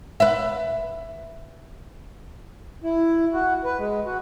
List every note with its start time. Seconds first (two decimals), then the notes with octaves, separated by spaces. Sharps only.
0.20 B4 E5
2.83 E4
3.34 F#4
3.64 B4
3.78 G#3
4.06 F#4